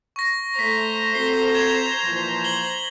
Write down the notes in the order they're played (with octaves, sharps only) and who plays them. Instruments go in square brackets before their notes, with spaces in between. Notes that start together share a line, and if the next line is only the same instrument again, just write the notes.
[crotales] C#6 A#6
[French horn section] A3 [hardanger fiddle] C5 A#5 [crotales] B6
[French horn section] C4 F#4 A4 [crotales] C7 G7
[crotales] G#6 E7
[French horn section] A#2 E3 F3
[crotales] F#7 G7